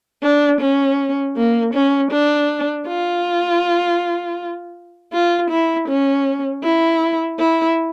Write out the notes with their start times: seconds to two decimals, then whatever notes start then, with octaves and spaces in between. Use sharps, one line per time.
0.23 D4
0.61 C#4
1.36 A#3
1.74 C#4
2.11 D4
2.87 F4
5.13 F4
5.50 E4
5.89 C#4
6.64 E4
7.39 E4